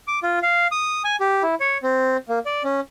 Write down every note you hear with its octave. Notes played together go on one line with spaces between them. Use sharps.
D6
F4
F5
D#6
G#5
G4
E4
C#5
C4
A#3
D5
C#4